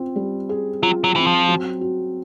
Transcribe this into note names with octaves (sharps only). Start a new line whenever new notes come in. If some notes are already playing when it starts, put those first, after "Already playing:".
Already playing: C4 F4
G3
G#4
F#3 F4
F#3
E3 C4
F3
F#3
F#4